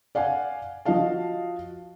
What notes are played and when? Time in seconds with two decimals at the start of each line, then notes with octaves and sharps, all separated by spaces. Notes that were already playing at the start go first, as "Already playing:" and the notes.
0.15 D5 F5 F#5 G#5
0.85 F3 F#4 D#5 F5 A5